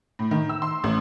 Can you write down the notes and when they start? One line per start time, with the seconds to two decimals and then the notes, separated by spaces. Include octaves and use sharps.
0.19 A2
0.31 D#3
0.49 E6
0.62 C6
0.84 A1